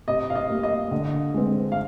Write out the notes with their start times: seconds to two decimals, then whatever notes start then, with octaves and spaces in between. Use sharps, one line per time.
0.08 C3 D#5
0.30 F5
0.35 D#5
0.49 G3 A#3
0.63 D#5
0.91 D3
1.34 G#3 C4
1.72 F5